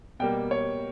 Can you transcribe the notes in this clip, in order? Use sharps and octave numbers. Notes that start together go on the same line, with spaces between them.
B2 G3 A#3 G5
C#5